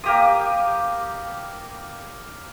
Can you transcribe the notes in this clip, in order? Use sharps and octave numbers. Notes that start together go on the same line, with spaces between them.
A#3 G4 D#6